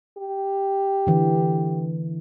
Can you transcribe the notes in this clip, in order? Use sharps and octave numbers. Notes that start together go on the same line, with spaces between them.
G4
D3 E3